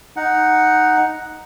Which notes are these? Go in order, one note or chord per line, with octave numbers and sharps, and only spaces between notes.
D#4 F#5